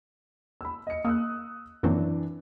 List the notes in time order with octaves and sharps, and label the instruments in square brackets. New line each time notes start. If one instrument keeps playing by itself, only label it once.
[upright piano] B5 E6
D#5 C#7
[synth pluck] A#3 [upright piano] D#6 E6 F#6
[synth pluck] F#2 F#3 C4 [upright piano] E3 D4